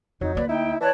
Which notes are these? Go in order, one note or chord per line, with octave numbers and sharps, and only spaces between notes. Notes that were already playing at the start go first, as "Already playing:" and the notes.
F2 F#3 D#4
D2 A#3 B4 D5
D#4 E4 G5
E3 C#5 D5 A5 F#6